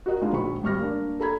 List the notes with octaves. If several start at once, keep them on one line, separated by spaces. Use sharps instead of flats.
F#4 A#4 D#5 F#5
G#3 D4 D#4 F4
A#1 F#4 B5 C#6
G#1 G3 C#6 F6 A#6
A#3 D4
A4 A#5 B5 G#6